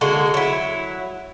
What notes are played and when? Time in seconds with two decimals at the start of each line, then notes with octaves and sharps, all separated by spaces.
0.01 D3 G#3 A#3 F#4
0.34 F#3 E4